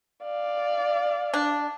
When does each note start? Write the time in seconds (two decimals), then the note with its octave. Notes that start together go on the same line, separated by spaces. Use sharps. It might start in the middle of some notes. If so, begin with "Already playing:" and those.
0.23 D5 F5
1.34 D4